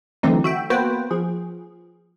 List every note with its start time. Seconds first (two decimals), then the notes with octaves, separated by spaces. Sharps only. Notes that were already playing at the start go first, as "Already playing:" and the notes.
0.23 D3 E3 F#3 A3 C4 D#4
0.44 F#4 E5 G5
0.70 A#3 B3 F#4 B4 C5 G5
1.11 F3 G#4